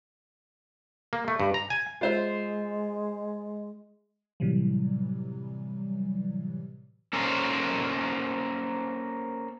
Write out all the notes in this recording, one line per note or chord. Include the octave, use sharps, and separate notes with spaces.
A#3
A3
G2
A#5
G#5
G#3 F4 C5 E5
A2 C3 E3 F#3 G3
A#3 C#4 A4 A#4 C5